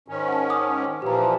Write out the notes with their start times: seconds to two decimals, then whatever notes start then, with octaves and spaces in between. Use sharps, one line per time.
0.08 G#2 D#3 C#4
0.28 F#5 A5
0.50 D6 D#6
1.02 A#2 E3 F3 G4 A#5